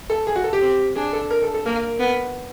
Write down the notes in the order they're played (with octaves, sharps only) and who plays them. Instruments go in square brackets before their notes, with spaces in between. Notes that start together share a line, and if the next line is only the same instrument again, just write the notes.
[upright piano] A4
G#4
F#4
A4
G4
[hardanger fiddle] C4
[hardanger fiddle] D4 [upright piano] G#4
[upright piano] A4
A#4
A4
A4
[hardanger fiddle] A#3 [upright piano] A#4
[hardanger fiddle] B3